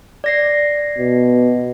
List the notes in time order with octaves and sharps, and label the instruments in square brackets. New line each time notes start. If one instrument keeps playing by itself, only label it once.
[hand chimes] D5 A#6 C7
[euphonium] B2